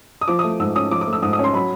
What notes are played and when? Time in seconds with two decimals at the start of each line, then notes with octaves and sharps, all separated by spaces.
0.21 D#6
0.28 F3 D6
0.39 D#6
0.44 A3
0.60 G#2 E6
0.75 C#4 D#6
0.91 F3 D6
1.01 D6
1.07 A3
1.13 E6
1.22 G#2 D#6
1.33 D#6
1.39 C#4
1.44 C6
1.54 F#3 B5